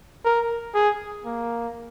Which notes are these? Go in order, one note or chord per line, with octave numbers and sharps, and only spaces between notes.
A#4
G#4
A#3